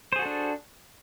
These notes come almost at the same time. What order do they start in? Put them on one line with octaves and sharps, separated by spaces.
C5 G#4 F#4 A4 D4